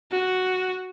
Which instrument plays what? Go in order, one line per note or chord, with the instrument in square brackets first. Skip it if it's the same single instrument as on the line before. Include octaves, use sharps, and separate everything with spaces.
[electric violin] F#4